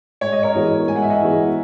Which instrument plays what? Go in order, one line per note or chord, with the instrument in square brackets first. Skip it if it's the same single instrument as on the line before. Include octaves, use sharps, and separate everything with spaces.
[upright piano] G#2 [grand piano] C#5
[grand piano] D#5
A#4 C#5
[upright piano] E3 G#3 B3 F#4
[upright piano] G#2 [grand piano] G#5
[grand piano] F#5
E5
D#5 F#5
[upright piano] E3 G#3 B3 F#4